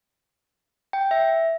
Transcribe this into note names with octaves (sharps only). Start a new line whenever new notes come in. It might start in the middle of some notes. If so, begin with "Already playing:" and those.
G5
E5